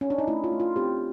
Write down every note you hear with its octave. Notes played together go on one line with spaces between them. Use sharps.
C#4
D4
D#4
A3 E4
F4
A3
F4
C4 G4